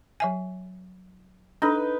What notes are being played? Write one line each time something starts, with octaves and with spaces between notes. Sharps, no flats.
F#3 E5 G#5
D4 D#4 A4 B4